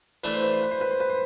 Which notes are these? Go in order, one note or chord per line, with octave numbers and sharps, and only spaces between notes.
E3 A3 D4 B4
C5
B4
C5
B4
C5
B4
C5
B4
C5